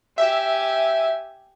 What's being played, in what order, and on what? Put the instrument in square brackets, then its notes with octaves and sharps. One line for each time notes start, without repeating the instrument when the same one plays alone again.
[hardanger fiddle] G4 G#5 [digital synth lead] E5